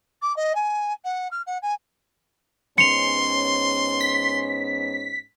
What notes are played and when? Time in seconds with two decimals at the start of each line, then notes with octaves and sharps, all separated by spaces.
0.22 D6
0.37 D#5
0.55 G#5
1.05 F#5
1.31 F6
1.47 F#5
1.62 G#5
2.78 G#2 B3 C#4 C6 C#7 F7
4.01 B6